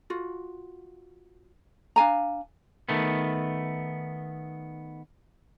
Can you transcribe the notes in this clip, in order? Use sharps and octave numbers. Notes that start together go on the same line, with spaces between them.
F4 F#4
D4 F5 G#5 A#5
D#3 A3 B3